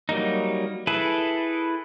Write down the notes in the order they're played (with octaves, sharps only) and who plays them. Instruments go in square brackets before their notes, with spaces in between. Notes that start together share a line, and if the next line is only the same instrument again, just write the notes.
[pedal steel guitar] F#3 G3 A#3 D#4
E4 G#4 A4 B4